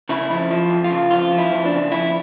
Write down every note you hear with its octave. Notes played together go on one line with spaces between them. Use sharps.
C#3 E4
F2 E4
F3
F2
F4
C#3
F2 F4
F3
E4
F2
D4
C#3
F2 E4